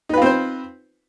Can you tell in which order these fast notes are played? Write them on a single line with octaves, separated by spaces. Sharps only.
D#4 B4 F4 C4 C5